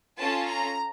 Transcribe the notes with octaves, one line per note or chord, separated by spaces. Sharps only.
C#4 F4 A4 A5
A#5